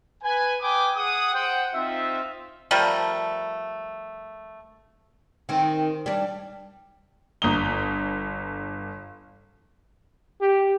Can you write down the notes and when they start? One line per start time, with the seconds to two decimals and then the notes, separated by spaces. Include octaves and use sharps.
0.23 B4 G#5
0.61 B4 G5 G#5 D6 D#6
0.95 G#4 F#5 D#6
1.33 C5 F#5 G5
1.74 C4 D#4 F4 E5
2.71 F3 G3 A3 A#4
5.49 D#3 C4
6.06 G3 D4
7.42 G1 A#5 D#6 G7
10.41 G4